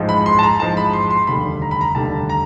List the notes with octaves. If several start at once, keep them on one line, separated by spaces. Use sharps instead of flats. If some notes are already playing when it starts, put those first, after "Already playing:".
Already playing: A1 G#2 F3 G#3
B5
C6
A5
A#5
A1 G#2 F3 G#3 A5
B5
C6
C6
F1 D#2 D3 G3 B5
A#5
B5
A#5
F1 D#2 D3 G3 A5
A#5